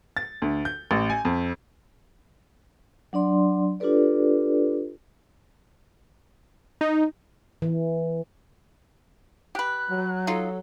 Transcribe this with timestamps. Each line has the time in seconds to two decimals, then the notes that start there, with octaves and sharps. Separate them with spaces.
0.17 A6
0.42 D2
0.65 G6
0.91 A1
1.10 G#5
1.25 F2
3.13 F#3 D4 D5 C6
3.80 D4 F4 G4 A4 B4 D5
6.81 D#4
7.62 E3
9.55 G4 B4 F#6
9.89 F#3
10.27 D#4 F4 A4